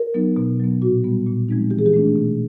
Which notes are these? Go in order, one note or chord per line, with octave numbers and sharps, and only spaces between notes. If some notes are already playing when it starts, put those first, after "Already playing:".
Already playing: A#4
F#3 B3 D#4
B2
F#3 B3
A#2 F#4
G3 B3
A#2
F3 G#3 C4 D#4
E3 G4
G#4
G4
A3 D4
B2